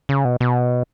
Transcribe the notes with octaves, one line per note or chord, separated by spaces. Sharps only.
C#3
B2
B2